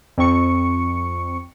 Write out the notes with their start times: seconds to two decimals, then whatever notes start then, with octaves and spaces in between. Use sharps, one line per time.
0.18 F2 C4 C#6 C#7